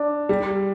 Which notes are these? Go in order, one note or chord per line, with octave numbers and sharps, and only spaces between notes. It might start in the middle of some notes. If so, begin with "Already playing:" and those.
Already playing: D4
G3